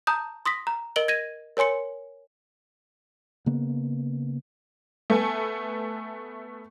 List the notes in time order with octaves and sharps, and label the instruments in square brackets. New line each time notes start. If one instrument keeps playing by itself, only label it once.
[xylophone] A5 A#5 D#6 G6
C6 D#6 A#6 B6
A#5
A#4 D#5 D7 F#7 G7
G#6 A#6 D#7
A#4 C#5 G#5 C6 C#7
[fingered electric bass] C#3 A#3 B3
[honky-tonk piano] A3 B3 A4 G#5